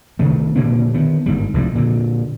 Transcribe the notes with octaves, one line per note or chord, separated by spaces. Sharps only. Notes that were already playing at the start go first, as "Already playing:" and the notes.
C3 D#3 A3
A#2 D3 A#3 B3
D#3 B3
G1 G#2 G3
F1 C2 F2 G3
A#2 D3